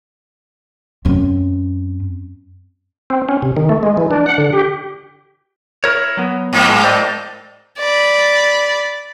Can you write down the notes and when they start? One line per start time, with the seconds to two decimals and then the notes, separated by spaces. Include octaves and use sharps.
1.05 F#2 C4
3.10 C4
3.29 C#4
3.42 C3
3.57 D#3
3.69 A3
3.83 G#3
3.97 E3
4.11 D4
4.26 F#5
4.38 D3
4.53 G4
5.84 E4 A#4 C#5
6.17 F#3 B3
6.53 G#2 A#3 C4
6.69 G#3
6.84 C5 D5 D#5
7.78 D5 B5